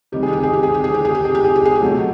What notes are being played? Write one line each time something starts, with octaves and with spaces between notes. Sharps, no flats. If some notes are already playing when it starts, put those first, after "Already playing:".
C3 D#3 G3 G4
G#4
G4
G#4
G4
G#4
G4
G#4
G4
G#4
G4
G#4
G4
G#4
G4
G#4
G4
B2 F#3 A3